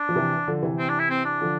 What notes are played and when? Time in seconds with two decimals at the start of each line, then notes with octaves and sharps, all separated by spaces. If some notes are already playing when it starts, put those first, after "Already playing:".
Already playing: D4
0.09 F3
0.15 C3 E3
0.47 D3 F3
0.63 C3 E3
0.79 C4
0.89 D4
0.99 E4
1.10 C4
1.25 D4
1.41 D3 F3